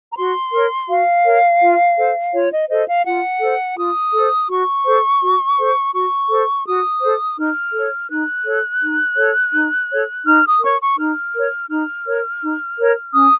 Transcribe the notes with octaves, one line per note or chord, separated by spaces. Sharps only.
A#5
F#4 C6
A#4 C#5
F#4 F5
A#4 C#5
F4
A4 C5
F4 C#5
D#5
A4 C5 D#5
F5
F4 F#5
A4 C5
F4 D#6
A4 C5
F#4 C#6
A4 C5
F#4
A4 C5
F#4 C#6
A4 C5
F#4 D#6
A4 C5
D#4 F6
A4 C#5
D#4 F#6
A4 C#5
D#4
A4 C#5
D#4
A4 C#5
D#4 F6
D#6
A#4 C#5 C#6
C#6
D#4 F6
A#4 C#5
D#4 F6
A#4 C#5
D#4
A#4 C#5
C#4 D#6